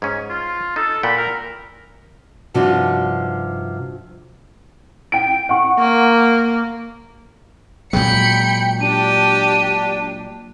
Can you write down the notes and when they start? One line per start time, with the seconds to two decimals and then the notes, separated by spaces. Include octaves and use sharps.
0.02 G#2 C#4 G#5
0.30 F4
0.76 D#4 A4
1.03 A#2 F#5 G5 B5
1.17 A#4
2.54 G2 C3 F3 D4 D#4 F#4
5.12 G5 D7
5.49 F#5 C#6
5.79 A#3
7.93 A#2 F#3 G#3 G5 B5 C#7
8.81 D4 G4 D#7